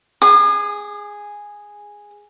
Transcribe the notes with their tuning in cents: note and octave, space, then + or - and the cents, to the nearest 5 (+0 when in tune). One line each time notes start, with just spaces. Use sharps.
G#4 -5 D#6 -45